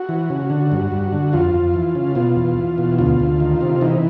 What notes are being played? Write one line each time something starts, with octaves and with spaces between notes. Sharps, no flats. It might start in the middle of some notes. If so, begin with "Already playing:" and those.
Already playing: F#4
E3
C#3
D3
G2
G2
D3
F2 F4
F2
E3
C#3
B2 F4
E2
E2
B2
D2 F4
D2
D#3
C3
E3 D#4